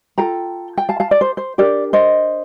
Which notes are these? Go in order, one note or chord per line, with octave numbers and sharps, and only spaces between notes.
F4 A4 G5 A#5
G5
F5 A5
F5 A5
D5
C5
C5
D4 G4 A#4 D5
C5 D#5